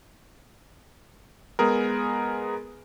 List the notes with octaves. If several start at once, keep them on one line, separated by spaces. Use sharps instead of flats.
G#3 B3 G#4 A#4